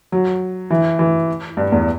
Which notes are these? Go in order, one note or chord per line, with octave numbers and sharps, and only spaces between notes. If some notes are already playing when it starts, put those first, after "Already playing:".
F#3
E3
E3
G2
E2